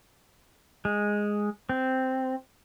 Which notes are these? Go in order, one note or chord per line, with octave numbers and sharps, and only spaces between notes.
G#3
C4